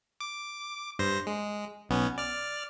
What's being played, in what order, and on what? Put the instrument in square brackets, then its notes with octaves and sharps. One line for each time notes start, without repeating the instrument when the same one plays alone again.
[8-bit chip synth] D6
G2 C5 A#6
G#3
B1 B3 C#4
D5 F6